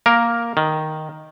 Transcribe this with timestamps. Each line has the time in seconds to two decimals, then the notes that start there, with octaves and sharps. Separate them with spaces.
0.06 A#3 A#4
0.57 D#3